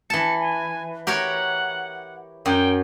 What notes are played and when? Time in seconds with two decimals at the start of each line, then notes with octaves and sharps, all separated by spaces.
0.10 E3 A5 C#7
0.40 G#5
1.07 G4 A#4 C#5 F#5
2.46 F#2 G5